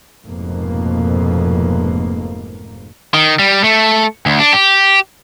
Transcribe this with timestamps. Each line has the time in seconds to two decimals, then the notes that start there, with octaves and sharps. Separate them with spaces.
0.25 F1 F2 G#2 B2 A#3
3.14 D#3
3.39 G3
3.64 A3
4.26 D2
4.40 D4
4.53 G4